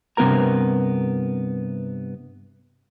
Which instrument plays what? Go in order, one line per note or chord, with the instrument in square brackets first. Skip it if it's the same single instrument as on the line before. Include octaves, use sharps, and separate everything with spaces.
[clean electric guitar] G2 C3 A#3 B3 A#4 A#5